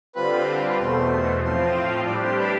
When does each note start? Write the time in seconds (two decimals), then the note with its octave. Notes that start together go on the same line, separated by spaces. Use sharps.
0.15 D3 G3 C4 F4 B4
0.69 B4
0.79 E2 B2 A3 C5
1.43 A2 F3 C4 F4 C5
2.06 A2 G3 D4 G4 D5
2.23 C5
2.38 B4